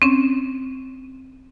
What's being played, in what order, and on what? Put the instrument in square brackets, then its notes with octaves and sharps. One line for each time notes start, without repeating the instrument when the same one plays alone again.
[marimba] C4 C#4